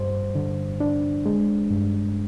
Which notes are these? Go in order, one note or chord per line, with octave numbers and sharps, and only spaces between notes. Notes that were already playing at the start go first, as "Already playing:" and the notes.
Already playing: G2 G3 C5
D3
D4
G#3
G2